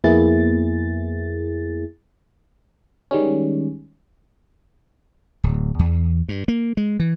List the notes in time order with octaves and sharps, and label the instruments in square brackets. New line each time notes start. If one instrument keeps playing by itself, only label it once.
[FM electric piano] F2 A#3 B3 E4 G#4 A6
D#3 G3 G#3 C#4
[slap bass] D1
E2
G2
A#3
G#3
E3